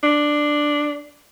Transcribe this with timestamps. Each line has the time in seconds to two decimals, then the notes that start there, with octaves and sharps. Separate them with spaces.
0.03 D4